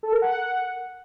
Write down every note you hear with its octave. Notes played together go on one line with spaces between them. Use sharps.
A4
A#4
F#5